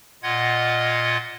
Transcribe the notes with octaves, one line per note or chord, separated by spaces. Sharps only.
A#2 F4 D#5 F#5 G#6